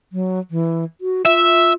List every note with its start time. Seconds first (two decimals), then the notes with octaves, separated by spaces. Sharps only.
0.12 F#3
0.51 E3
1.01 F#4
1.25 F4 E5